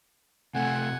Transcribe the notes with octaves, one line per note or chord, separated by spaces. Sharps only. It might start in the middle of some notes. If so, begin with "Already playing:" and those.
C3 A3 F#5 G#5